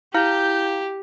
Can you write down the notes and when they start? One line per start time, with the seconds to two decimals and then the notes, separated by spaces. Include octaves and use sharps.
0.14 E4 G4 F5 A#5 G6